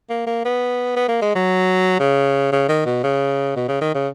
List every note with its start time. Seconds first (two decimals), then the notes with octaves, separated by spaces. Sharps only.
0.10 A#3
0.27 A#3
0.45 B3
0.96 B3
1.08 A#3
1.22 G#3
1.35 F#3
1.99 C#3
2.52 C#3
2.69 D#3
2.86 B2
3.04 C#3
3.56 B2
3.68 C#3
3.81 D#3
3.95 C#3